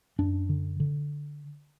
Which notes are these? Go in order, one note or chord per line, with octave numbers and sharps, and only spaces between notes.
F#2 D4
D3
D3